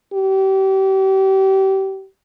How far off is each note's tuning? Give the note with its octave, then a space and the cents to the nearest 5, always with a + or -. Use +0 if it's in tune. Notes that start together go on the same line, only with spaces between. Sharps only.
G4 -30